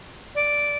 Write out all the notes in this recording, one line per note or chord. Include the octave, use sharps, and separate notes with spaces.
D5